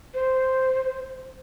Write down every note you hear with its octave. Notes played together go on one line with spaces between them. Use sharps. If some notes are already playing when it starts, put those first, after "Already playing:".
C5